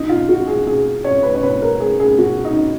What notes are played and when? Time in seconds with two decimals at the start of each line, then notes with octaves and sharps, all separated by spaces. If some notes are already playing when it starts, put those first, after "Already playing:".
Already playing: B2 D#4
0.09 F4
0.29 F#4
0.47 G#4
0.66 B2 G#4
1.04 C#5
1.23 B4
1.35 C#5
1.43 B2 B4
1.62 A#4
1.80 G#4
2.00 G#4
2.18 B2 F#4
2.45 D#4